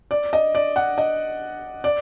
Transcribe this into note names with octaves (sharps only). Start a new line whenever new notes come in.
D5
D#5
D5
F#5
D#5
D5